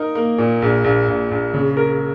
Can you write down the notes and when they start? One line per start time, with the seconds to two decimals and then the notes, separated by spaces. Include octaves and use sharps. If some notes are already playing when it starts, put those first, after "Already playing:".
Already playing: D#4 A#4
0.15 A#3
0.38 A#2
0.62 A#1
0.84 A#1
1.08 A#1
1.31 A#1
1.54 C#3
1.77 A#4